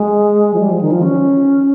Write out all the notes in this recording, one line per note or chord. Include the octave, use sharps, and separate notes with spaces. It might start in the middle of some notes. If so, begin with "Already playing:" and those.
Already playing: G#3
F3
G3
F3
D#3
F3
C#4